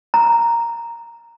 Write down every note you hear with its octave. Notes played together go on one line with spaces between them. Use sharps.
A#5